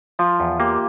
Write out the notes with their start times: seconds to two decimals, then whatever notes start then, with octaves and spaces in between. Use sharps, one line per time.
0.19 F3 F4
0.40 E2
0.60 A#3 G4